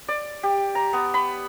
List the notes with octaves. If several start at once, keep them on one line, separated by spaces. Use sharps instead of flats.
D5
G4
A#5
B3
B5